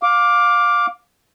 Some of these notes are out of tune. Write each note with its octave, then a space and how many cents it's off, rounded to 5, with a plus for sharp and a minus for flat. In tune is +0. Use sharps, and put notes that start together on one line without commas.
F5 +20 D6 +0